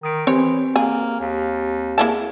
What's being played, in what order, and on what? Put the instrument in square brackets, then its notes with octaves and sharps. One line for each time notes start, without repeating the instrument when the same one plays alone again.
[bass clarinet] D#3 [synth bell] D#6 D7
[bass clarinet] E3 [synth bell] C4 G4 [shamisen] C#5
[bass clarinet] A#3 [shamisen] G#4
[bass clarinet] D#2
[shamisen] A#3 E4 A5 [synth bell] G#4